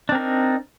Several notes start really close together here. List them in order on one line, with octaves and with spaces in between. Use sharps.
D4 C4 A#4 D#4